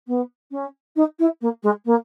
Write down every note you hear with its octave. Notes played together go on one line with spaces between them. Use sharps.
B3
C#4
D#4
E4
A#3
G#3
A#3